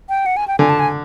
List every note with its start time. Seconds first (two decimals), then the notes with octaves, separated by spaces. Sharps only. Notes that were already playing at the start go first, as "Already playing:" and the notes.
0.09 G5
0.26 F#5
0.37 G#5
0.48 G5
0.59 D3 G#5
0.69 A5
0.79 G#5